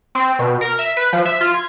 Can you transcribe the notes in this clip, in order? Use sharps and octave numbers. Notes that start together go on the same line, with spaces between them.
C4
B2
A#4
E5
B4
F3
E5
F4
G#6